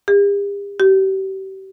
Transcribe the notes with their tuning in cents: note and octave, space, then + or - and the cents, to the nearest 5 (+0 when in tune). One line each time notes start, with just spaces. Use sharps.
G4 +45
G4 -35